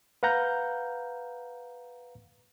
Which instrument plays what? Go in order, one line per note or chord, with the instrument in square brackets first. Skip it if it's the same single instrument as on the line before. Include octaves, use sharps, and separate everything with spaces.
[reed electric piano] B4 F5 F#5 A#5 G6